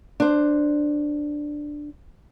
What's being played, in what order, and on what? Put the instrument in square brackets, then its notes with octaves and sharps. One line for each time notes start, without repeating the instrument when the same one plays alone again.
[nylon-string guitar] D4 C5